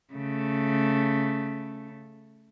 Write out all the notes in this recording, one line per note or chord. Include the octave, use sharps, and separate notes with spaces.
C#3 A3